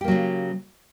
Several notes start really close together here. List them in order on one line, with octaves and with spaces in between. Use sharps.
G4 A#3 F#3 C#3